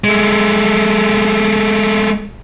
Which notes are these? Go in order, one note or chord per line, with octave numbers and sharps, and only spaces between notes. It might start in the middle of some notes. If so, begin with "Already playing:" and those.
G#3 A3